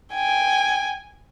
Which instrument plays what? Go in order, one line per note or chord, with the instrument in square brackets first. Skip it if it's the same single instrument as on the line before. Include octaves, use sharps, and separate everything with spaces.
[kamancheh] G5 G#5